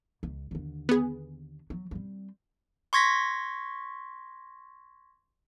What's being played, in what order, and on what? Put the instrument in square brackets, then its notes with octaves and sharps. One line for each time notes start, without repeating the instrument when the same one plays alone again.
[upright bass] C#2
D#2 D3
[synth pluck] B3 G#4
[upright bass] F#3
G3 C4
[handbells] C6 C#6 G#6 A#6 B6